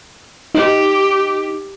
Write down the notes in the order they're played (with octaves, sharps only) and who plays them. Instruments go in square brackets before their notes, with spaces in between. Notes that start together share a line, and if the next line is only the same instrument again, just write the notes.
[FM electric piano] D#4 [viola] G4